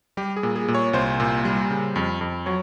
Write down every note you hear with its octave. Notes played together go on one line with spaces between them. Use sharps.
G3 G4
G#4
A#2
G#4
A#2
C#5
C2 C5
A#2
G3
C#3
F2
F2
F#3 C#5